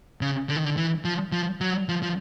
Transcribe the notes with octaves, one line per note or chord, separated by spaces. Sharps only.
C#3
D3
D#3
D3
E3
F3
F3
F#3
F3
F3